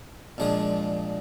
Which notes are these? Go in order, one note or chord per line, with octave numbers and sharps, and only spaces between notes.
A#2 F3 G#3 D4 G#4